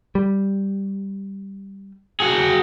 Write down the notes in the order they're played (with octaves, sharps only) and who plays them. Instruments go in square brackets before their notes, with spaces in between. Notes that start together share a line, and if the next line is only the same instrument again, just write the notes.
[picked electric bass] G3
[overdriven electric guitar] F#4 G#4